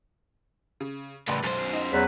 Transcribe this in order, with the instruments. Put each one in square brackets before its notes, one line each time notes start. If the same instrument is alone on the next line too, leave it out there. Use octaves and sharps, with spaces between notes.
[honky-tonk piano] C#3
[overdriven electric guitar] A2 C#3 [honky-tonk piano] B4 D5 C6
[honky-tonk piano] B1 [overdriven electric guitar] F#2 C5
[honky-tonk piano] D#4 D#5
[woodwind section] E2 F#3 B4